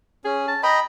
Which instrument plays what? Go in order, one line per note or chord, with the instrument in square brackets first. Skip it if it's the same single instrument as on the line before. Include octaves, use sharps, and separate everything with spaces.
[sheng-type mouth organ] C#4 [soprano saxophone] G#4
[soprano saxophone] A5
[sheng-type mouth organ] D#5 G5 A#5 [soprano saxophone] B5